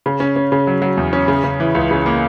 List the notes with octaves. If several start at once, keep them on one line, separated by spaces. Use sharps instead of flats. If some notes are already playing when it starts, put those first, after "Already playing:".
C#3
C#4
C#4
C#3
F#3
F#3
E2
C#4
C#3
C#3
E3
C#2
C#3
A#3